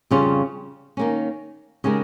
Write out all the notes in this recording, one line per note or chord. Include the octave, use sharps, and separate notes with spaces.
F2 C#3 G3 C#4 F4
D#3 A#3 C#4
C#3 G#3 D#4 G4 A#4